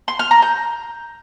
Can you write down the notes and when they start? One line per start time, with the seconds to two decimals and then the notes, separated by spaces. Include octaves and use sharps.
0.08 C6
0.19 F6
0.31 A#5
0.42 G6